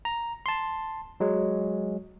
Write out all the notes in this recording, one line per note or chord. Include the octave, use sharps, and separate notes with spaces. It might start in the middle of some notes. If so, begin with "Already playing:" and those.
A#5
A5 C6
F#3 G#3